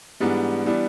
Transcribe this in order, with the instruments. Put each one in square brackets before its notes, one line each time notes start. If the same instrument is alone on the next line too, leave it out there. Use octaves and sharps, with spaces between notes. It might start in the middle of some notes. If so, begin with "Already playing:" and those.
[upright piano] G#2 E3 G3 B3 D4
E3 G3 B3 D4